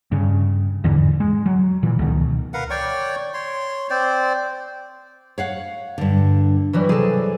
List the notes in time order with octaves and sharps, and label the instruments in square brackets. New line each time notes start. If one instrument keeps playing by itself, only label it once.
[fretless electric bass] G2 C#3
E2 G#2 D3 E3
G#3
F#3
A#2 E3
C#2 B2 D#3
[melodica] A#4 B4 F5 F#5
C#5 D5 G5 C#6
C#5 C6
C4 C5 D5
[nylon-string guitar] C#5 F5 F#5
G2 D3
[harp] E3 F#3 G3
[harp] C3 G#4 [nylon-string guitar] A4 D5